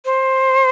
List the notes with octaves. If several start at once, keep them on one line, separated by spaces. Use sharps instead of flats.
C5